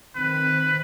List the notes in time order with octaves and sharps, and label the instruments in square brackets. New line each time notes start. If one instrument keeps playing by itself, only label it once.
[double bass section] D#3 C4 [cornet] B4